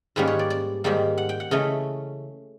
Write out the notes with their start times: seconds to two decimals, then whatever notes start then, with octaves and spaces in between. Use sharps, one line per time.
0.16 G#2 D#3 G3 A#3 C#4 B4
0.27 C#5
0.39 D5
0.50 D5
0.84 G#2 D#3 G3 A#3
1.18 F#5
1.29 G5
1.40 F#5
1.51 C#3 E3 A3 C#4 D#5